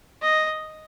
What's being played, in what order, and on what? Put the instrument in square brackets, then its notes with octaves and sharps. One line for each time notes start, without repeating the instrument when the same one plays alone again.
[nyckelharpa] D#5